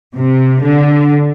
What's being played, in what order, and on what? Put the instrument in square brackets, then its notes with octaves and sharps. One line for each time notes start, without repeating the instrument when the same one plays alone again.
[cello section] C3
D3